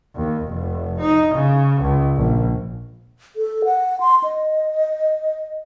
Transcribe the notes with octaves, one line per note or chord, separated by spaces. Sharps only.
D#2
F1
D#4
C#3
C#2
A#1
A4
F#5
C6
D#5